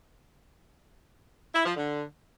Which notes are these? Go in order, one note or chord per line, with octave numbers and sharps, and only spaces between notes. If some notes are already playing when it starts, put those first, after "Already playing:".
E4
F3
D3